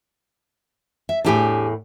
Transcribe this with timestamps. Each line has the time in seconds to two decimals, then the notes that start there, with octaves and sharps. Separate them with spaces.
1.09 E5
1.25 E2 A2 D4 G4 G#5